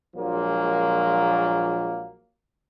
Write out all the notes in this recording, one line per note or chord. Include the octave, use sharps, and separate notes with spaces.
A#1 A#2 F3 F#3 G#3 A#3